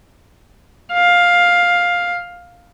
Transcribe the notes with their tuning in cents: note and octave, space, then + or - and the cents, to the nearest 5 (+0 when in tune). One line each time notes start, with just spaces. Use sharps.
F5 +10